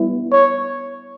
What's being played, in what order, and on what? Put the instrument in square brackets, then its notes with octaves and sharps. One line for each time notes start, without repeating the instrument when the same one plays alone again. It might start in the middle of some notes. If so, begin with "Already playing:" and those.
Already playing: [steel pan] G3 B3 E4
[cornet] C#5